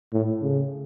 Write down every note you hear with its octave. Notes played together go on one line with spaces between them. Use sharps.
A2
C#3